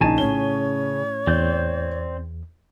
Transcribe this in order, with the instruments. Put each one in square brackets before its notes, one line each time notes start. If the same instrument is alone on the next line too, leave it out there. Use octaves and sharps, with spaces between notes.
[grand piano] A#1 D#4 [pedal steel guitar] C#3 G#5 A5
[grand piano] A2 C#4 G7 [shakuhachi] C#5
[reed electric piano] E2 [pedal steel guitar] C4 D5 G6